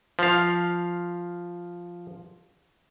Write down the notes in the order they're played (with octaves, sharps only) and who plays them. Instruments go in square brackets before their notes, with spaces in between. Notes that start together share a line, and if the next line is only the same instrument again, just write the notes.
[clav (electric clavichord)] F3 F5